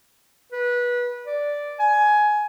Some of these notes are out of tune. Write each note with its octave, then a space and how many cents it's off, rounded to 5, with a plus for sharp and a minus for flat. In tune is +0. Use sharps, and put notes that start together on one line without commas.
B4 -20
D5 -5
G#5 +15